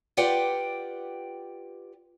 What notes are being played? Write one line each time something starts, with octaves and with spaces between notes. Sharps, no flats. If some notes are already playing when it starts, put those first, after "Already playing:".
F4 G4 B4 D5 F#5 G5